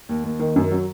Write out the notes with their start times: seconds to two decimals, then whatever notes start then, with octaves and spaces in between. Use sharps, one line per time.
0.09 D#2
0.24 D#2
0.39 D#3
0.56 F#2
0.71 F#3